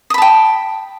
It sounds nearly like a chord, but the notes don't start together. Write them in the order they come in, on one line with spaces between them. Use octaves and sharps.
D#6 B5 A5 G5